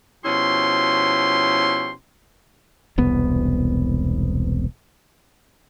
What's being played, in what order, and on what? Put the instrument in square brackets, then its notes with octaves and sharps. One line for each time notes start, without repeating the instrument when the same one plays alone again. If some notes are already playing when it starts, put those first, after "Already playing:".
[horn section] B2 F3 C#4 E4 G4 C6
[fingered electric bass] E1 C2 B3